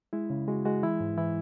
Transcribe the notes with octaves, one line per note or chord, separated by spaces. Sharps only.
G#3 E4
C#3
G#3 F#4
G#3 F#4
E3 E4
G#2
E3 E4